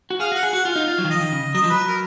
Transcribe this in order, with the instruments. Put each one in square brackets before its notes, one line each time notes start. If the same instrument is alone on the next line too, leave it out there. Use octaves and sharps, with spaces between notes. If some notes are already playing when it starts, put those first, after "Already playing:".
[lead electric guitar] F#4
[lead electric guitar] G#4 [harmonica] F5
[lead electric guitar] F#4 [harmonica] F#5
[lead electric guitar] G#4
[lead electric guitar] F#4 [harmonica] F#5
[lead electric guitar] F4 [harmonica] F5
[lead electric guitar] D#4
F4
F#3
D#3
[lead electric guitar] F3 [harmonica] D#5
[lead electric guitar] D#3
C#3
[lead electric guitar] F#3 [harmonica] D#5
[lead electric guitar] F3
[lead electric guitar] F#3 [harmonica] B4
[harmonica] A#4